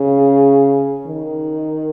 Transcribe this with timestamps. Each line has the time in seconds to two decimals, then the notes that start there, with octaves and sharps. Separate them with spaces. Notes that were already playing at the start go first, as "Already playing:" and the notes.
Already playing: C#3
1.07 D#3